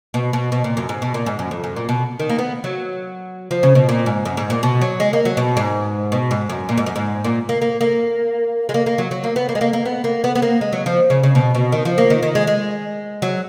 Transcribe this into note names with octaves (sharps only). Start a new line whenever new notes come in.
B2
B2
B2
A#2
F#2
G#2
B2
A#2
G#2
F#2
F2
F#2
A#2
B2
D#3
A#3
B3
F#3
F3
C#3
B2
A#2
G#2
F#2
G#2
A#2
B2
F#3
G#3
A#3
F#3
B2
G#2
B2
G#2
F#2
A#2
G#2
F#2
G#2
A#2
A#3
A#3
A#3
G#3
A#3
A#3
F#3
F#3
A#3
B3
A#3
G#3
A#3
A#3
B3
A#3
B3
B3
A#3
G#3
F#3
F3
C#3
C#3
B2
B2
D#3
F3
A#3
D#3
D#3
G#3
G#3
F#3